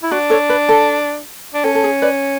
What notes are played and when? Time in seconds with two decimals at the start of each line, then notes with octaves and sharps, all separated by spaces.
0.03 E4
0.11 D4 F#4
0.30 A4 C#5
0.49 B4
0.69 A4
1.54 D4
1.64 C#4 A4
1.75 A4
1.84 G#4
2.02 B4 D5